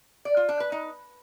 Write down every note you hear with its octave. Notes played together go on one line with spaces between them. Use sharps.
D5
F4
D4
B4
D#4